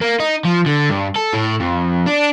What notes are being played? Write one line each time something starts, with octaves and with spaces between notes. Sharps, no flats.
A#3
D#4
F3
D3
G2
A4
A2
F2
D4